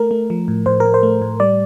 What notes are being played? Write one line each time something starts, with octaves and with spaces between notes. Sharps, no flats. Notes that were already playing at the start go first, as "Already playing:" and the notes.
Already playing: A3 A#4
A3
F3
A2
A2 C5
A2 A#4
C5
A3
A2
G3 D5